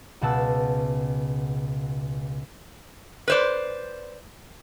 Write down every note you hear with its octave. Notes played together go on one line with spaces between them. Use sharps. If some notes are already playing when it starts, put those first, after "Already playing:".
C#2 B2 F#5 A5 E6
B4 C5 D5